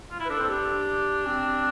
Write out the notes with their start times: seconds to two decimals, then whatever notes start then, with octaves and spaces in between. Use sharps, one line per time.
0.11 F4
0.20 E4
0.25 B4
0.30 D4 A4
0.39 C4
0.48 D4 G4
1.26 C4